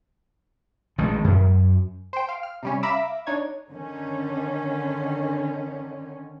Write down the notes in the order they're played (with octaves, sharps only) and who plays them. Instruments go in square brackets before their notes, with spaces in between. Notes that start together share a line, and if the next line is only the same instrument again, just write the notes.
[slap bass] A1 D#3 G#3 A3
F#2
[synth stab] C5 G5
F5
F6
C3 G3 C#4
E5 F5 A#5 B5 D6 E6
D4 D#4 C#5 G#6
[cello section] D3 D#3 C#4